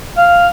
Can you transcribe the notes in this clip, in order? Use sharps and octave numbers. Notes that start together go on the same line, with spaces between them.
F5